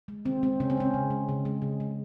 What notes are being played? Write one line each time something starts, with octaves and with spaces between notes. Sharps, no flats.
G#3
D#3 C4
G#3 C4
C#3 C#4
C4
G#3 C#4
C#3
G#3
C#3
G#3
C#3
G#3